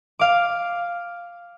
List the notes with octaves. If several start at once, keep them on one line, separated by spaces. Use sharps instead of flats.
F5 D6